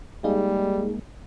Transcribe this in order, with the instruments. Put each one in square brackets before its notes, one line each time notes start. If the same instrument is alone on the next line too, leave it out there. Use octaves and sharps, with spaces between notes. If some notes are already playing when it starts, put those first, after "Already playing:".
[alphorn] G3 [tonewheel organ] G#3 A#3 [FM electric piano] D#4 G#4